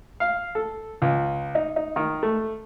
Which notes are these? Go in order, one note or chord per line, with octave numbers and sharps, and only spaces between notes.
F5
A4
C#2
D#4
D#4
D#3
A3